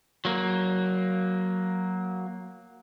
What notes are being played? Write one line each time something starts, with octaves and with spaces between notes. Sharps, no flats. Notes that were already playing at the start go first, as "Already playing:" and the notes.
F#3 A#3